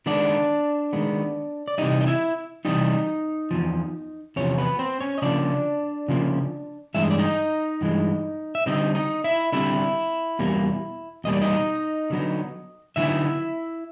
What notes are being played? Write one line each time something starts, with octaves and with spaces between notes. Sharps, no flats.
D#3 G#3 B3 D4 D5
D#3 G#3 B3
D5
C3 E3 G3 D#4 D#5
D#5
E4 E5
C3 E3 G3 D#4 D#5
E2 C3 F3
E2 C3 F3 C#4 C#5
B3 B4
C4 C5
C#4 C#5
D#5
C#3 F3 A#3 D4 D5
C#3 F3 A#3
G2 E3 G#3 E5
D#5
D5
D#4 D#5
G2 E3 G#3
E5
D3 G3 C4 D#4 D#5
D#4 D#5
E4 E5
D3 G3 C4 E4 E5
E2 B2 G3 A#3
E2 B2 G3 A#3 D#5
D5
D#4 D#5
D3 F#3 B3 D#4
D3 F#3 B3 D#4 E4 E5